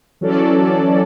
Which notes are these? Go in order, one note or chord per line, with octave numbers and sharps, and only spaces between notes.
E3 F#3 C#4 A4 D5